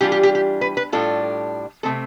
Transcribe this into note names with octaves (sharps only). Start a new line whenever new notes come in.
E3 G3 D4 F4 G4
G4
G4
G4
B4
B4
A2 G3 D4 F4 A4
C3 F3 A3 C4 A4